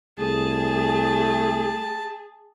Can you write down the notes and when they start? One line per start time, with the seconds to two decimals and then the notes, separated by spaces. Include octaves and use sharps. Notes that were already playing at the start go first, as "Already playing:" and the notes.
0.20 C2 A3 G#4 A5